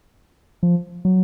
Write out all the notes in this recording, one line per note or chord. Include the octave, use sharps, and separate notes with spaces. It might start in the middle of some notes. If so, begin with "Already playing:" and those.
F3
F#3